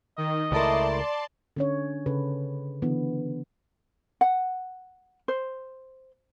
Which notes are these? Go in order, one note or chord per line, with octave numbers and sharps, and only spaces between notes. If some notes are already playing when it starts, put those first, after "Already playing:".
D#3 D#5
C#2 A3 E4 A#4 D5 A5 C6
D3 C#4 C#5
C#3 A4 B4
D3 E3 B3
F#5
C5